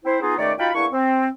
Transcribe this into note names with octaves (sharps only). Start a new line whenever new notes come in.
C4 E4 C5
B3 D#4 F4 G#4
C#2 D#3 A3 C#5 D5
D#4 F4 F#4 G5 A5 B5
E2 A#3 D4 E4 C#6
C4